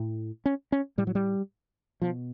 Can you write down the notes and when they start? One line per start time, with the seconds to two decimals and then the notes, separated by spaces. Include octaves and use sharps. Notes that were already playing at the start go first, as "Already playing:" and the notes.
Already playing: A2
0.46 C#4
0.72 C#4
0.98 A2 G3
1.07 F#3
1.15 G3
2.02 B2 F3